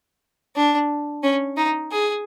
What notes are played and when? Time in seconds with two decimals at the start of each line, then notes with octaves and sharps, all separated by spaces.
0.56 D4
1.23 C#4
1.57 D#4
1.92 G#4